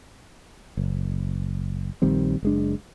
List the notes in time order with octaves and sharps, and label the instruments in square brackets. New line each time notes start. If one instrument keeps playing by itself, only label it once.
[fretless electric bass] F#1
A#1 D#3 G3 C4
F#1 G#3 D4